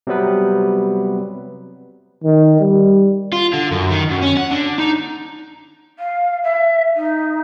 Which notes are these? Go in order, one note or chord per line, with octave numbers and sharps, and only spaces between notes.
C3 F#3 G3 B3 B4
D#3
G3
F4
D3
F#2
D#3
F#2
C#4
F#5
D3
D#4
F5
E5
D#4